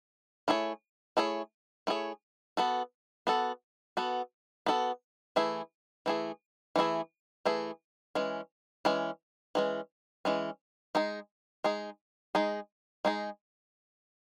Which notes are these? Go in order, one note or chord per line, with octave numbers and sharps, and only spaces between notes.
A3 E4 G#4 C#5
A3 E4 G#4 C#5
A3 E4 G#4 C#5
B3 F#4 A4
B3 F#4 A4
B3 F#4 A4
B3 F#4 A4
E3 A3 E4 G#4
E3 A3 E4 G#4
E3 A3 E4 G#4
E3 A3 E4 G#4
E3 G#3 C#4
E3 G#3 C#4
E3 G#3 C#4
E3 G#3 C#4
G#3 D#4 G#4
G#3 D#4 G#4
G#3 D#4 G#4
G#3 D#4 G#4